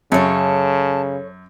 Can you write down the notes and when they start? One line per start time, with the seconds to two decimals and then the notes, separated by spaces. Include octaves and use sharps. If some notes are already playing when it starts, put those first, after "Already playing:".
0.12 F#2 C#3 A4 C#5 A5